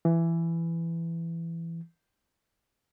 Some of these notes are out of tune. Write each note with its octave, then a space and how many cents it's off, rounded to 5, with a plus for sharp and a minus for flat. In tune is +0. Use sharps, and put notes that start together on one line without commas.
E3 +15